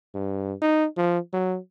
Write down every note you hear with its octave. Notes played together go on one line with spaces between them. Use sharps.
G2
D#4
F3
F#3